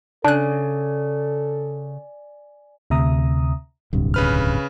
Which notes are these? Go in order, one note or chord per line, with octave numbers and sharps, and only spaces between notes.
C#3 D4 A4 D5 G#5 F#6
D2 C3 E5 A#5 D#6
D1 C2 G2
C#3 B4 F6